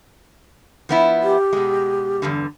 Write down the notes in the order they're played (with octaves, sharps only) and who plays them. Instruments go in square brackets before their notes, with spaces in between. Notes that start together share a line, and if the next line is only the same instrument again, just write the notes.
[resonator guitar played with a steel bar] F3 B3 E4
[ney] G4
[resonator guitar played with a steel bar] B2 G#3
E2 G2 D3